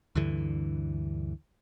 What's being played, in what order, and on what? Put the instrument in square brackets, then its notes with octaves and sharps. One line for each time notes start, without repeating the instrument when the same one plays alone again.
[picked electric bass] D2 G2 D3 E3